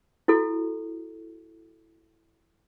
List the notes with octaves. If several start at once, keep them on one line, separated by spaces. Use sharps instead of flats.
E4 F#4 A4